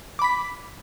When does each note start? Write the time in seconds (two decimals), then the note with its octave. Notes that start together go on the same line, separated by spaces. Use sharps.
0.19 D6
0.22 B5
0.24 B6